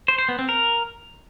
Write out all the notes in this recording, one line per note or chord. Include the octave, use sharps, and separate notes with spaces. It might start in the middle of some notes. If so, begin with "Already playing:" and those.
C5
C5
B3
C4
A#4